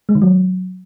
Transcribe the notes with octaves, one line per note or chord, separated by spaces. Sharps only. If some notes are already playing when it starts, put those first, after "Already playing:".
G#3
D#3
F#3